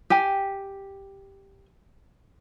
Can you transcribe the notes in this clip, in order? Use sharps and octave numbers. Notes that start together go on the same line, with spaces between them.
G4 G#5